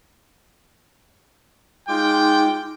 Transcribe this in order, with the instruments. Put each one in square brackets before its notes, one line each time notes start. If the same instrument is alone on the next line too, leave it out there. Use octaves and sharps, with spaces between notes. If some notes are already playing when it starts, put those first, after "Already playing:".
[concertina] G#3 F4 D6 [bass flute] D#4 [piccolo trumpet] G5